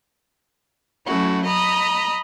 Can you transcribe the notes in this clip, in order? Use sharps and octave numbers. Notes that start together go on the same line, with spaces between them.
F#3 A3 C#4 E4 F#4
D#5 A#5 B5 D#6